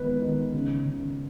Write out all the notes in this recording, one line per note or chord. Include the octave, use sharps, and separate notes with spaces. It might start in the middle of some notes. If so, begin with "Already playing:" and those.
Already playing: D#3 G#3 B3 B4
D#3
C#3
C#3